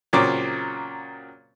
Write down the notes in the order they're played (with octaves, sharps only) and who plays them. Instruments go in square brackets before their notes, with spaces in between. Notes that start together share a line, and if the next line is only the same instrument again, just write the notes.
[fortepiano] A#2 C#3 F#3 C4 D6